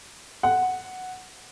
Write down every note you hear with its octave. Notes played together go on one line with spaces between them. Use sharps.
F#5